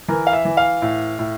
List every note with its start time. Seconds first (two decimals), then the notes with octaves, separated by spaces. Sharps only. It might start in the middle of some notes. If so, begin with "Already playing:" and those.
0.08 E3 A#4
0.27 F5
0.33 E5
0.45 E3
0.57 F5
0.82 A2
1.19 A2